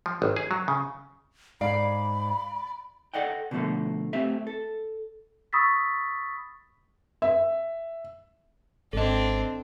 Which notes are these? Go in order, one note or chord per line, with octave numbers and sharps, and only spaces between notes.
F3
G#1
G#4
F#3
C#3
G#2 D5 F5 B5
A4 D5 D#5 F#5 G5
B2 D3 F3 F#3 A3 A#3
A3 C4 G4 E5
A4
B5 C#6 D#6 E6 A6 B6
E5
G#1 C4 D4 A4 D#5